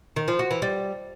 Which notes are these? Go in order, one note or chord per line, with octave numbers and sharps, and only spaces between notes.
D#3
F3
F#4
E3
G3